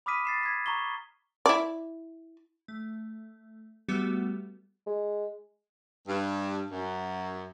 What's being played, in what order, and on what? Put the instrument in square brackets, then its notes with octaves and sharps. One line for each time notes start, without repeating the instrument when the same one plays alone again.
[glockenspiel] B5 D6 D#6 F6 B6 D#7
A6 C7 E7
G#6 B6
A#5 C#6 G7
[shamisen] E4 D5
[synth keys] A3
G3 A3 B3 F#4 G4
[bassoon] G#3
[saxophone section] G2
F#2